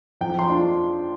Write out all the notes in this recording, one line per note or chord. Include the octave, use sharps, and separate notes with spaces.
F2 G5
C6
F3 D4 F4